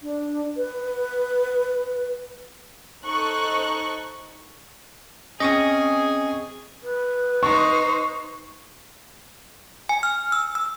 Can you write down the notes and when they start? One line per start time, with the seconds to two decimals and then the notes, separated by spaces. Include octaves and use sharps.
0.03 D4
0.57 B4
3.05 D#4 A4 C5 C#6 F#6
5.40 C4 C#4 G#4 D#5 C#6 D#6
6.83 B4
7.43 D#4 C5 C#6
9.89 G#5
10.03 F6
10.32 E6
10.55 E6